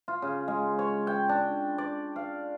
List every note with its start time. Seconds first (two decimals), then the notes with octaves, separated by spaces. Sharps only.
0.08 F4
0.22 C#3
0.48 G#3
0.79 C#5
1.07 G5
1.29 D4
1.78 D5
2.16 F5